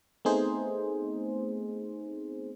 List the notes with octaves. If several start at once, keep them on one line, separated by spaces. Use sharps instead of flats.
A3 B3 C4 D#4 G#4 C5